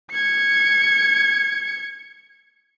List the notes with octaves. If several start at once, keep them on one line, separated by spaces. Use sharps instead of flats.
G#6 C#7